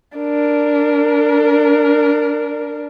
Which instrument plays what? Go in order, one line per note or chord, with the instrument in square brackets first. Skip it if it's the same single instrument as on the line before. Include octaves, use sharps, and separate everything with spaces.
[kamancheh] D4 A#4